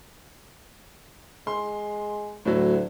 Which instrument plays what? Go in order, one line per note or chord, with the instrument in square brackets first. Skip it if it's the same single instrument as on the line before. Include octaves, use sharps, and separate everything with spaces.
[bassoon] G#3 [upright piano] C6
[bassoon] D2 [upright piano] A2 F#3